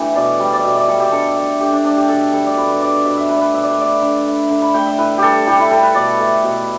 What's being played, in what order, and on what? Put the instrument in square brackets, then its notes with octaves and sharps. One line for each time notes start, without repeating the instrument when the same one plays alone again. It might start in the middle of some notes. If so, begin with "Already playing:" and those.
Already playing: [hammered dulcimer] E3 A3 D4 G4
B2 D5
G3
D5
B2 E5
D5
G3 A4
G4
D3 A4
A3
D3 G4
D4
A3 D4
G4
B2 A4
G3 A4
D5
B2 B4
B4
G3 D5
B2 E5
E5
A3 B4
D5
B4
B2 E5
D5
B4
A3 D5
D3
A3
D3
B5
A3 G5
E5
A2 B4
G3 G4 A4
A2 G4
E4
G3 A4
B4
B2 D5
A3
B2